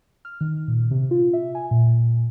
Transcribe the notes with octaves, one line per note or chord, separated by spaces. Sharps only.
F6
D#3
A#2
C3
F4
E5
G#5
A#2